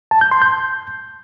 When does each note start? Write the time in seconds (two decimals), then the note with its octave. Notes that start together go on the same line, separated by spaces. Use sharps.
0.11 A5
0.21 G6
0.31 C6
0.42 G6